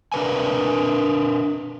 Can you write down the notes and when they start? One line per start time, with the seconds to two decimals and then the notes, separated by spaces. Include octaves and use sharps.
0.12 D4 A#4 B4 G#5